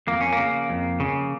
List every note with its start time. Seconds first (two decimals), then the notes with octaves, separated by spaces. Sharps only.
0.07 F2 A#3
0.21 C#4
0.33 A#3
0.38 C#3
0.70 F2
1.00 C#3